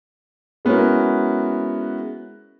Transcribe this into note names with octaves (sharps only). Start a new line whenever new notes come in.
G#3 B3 C#4 E4 F#4 A#4